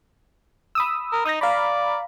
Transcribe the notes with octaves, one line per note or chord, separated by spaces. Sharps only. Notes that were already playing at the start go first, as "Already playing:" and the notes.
B5 D#6 E6
A#4
D#4 D#6 G6 A#6
D5 F5 A#5 B5